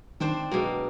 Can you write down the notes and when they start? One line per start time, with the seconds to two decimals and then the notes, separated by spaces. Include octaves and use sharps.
0.20 D#3 C4 D4 C5
0.51 B2 F#3 G#3 A#3